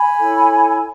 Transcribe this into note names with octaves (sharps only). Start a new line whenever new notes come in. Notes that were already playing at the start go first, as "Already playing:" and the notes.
Already playing: G#5 B5
E4 A4 C#5